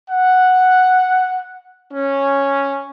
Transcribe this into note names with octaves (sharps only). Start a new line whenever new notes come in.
F#5
C#4